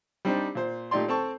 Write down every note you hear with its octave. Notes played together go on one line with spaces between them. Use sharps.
G3 C4 D4 D#4 C5
A#2 C5
A#2 A3 D#4 G4 D5 C6
C4 A4 A5 C#6